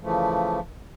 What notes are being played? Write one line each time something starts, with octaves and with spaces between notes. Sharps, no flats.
C#3 E3 F3 A3